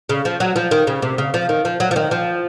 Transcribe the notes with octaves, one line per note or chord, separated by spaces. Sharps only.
C#3
F3
F#3
F3
D#3
C#3
C3
C#3
F3
D#3
F3
F#3
F3
D#3
F3